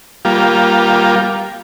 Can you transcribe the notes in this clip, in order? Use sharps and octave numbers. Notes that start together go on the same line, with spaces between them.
G3 A#3 F4